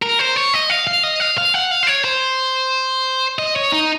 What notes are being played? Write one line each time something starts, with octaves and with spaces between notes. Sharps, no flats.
A#4
C5
C#5
D#5
F5
F5
D#5
F5
F5
F#5
F5
C5
C#5
C5
D#5
C#5
D#4